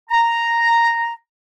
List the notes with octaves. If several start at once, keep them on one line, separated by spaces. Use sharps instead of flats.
A#5